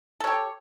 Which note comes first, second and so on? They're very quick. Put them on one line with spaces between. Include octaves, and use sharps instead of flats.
A4 C#5 G4